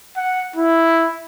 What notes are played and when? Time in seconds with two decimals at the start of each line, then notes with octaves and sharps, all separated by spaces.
0.17 F#5
0.56 E4